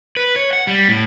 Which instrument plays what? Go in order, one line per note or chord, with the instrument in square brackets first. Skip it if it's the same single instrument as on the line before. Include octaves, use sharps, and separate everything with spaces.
[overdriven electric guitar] B4
C#5
F#5
G3
A2